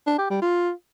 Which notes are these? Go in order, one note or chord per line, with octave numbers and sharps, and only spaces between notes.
D4
G4
G3
F4